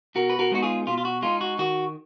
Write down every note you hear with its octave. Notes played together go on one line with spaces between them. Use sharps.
B2 F#4 A#4
B4
F#4 A#4
G#3 B3 D#4 F#4
F4 G#4
B2 F4
F4
F#4
G#3 B3 D#4 F4
F#4
D#3 F#4